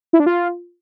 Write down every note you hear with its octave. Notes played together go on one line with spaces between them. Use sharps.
E4
D4
F4